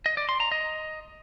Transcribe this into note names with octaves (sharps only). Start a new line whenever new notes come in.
D#5
D5
C6
A#5
D#5